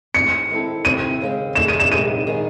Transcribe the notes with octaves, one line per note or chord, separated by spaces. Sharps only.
A2 G#3 C4 C#7
D#3 G#3 C4 E4 A4
C3 D#3 A3 C4 E4 D#7
D#2 C#3 G#3 C4
D#3 A3 D#4 G#4 E7
D#7
E7
C3 D#3 G#3 D#7
D#3 G#3 D#4 G#4